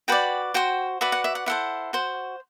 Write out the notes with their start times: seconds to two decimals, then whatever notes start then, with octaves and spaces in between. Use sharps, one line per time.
0.08 F#4 B4 D5 G5
0.54 F#4 C5 G5
1.01 F#4 B4 D5 E5
1.12 F#5
1.24 E5
1.35 F#5
1.46 E4 A4 C5 F#5
1.93 F#4 C5